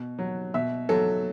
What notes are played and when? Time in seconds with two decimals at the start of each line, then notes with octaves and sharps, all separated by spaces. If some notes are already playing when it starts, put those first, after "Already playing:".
Already playing: B2
0.19 F#3
0.54 B2 E5
0.89 F#3 A4